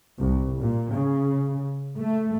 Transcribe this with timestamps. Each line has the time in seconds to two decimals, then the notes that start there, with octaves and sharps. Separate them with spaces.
0.20 C2
0.61 A#2
0.93 C#3
1.98 A3